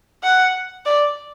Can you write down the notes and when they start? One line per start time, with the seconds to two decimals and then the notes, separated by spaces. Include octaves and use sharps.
0.24 F#5
0.86 D5